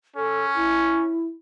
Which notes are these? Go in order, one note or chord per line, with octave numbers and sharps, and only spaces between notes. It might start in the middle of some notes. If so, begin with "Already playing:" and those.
C#4 A4
E4